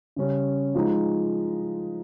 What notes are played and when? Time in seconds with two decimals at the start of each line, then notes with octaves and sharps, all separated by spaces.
0.16 C#3 G3 C#4
0.75 F3 G#3 D#4